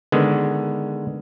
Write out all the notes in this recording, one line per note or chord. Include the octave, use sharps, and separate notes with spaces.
D3 D#3 G#3 B3